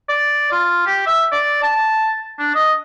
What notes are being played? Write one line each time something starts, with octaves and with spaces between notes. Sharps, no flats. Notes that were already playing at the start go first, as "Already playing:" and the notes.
D5
F4
G4
E5
D5
A5
D4
D#5